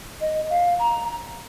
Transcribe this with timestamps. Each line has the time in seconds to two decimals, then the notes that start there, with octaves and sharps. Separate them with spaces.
0.21 D#5
0.50 F5
0.79 A#5